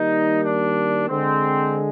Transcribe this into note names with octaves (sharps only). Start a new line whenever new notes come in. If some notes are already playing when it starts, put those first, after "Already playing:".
Already playing: D#3 G3 A#3 D#4
D4
D3 G#3 C4